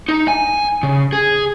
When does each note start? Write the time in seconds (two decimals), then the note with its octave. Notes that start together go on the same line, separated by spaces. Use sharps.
0.09 D#4
0.28 G#5
0.83 C#3
1.13 G#4